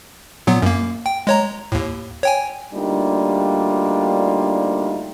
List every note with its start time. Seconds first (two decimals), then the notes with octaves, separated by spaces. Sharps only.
0.47 A#2 F#3 B3
0.62 F#2 A#3
1.06 G5
1.27 G#3 C#5 A#5
1.72 D#2 A2
2.23 C#5 G5 G#5
2.74 D2 G3 A#3 D4 D#4 F4